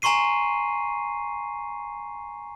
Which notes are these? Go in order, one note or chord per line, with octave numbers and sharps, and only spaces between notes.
G#5 A#5 C6 C#6 C7 D#7